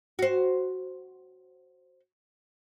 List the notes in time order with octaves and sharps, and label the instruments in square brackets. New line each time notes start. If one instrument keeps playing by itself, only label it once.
[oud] F#4 C5